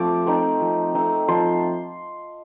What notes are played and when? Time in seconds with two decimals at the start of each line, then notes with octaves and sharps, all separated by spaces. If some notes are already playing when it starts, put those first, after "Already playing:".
Already playing: F3 A3 C4 D6
0.26 A3 C4 D#4
0.61 F3
0.94 A3 C4 D#4
1.28 F3 C6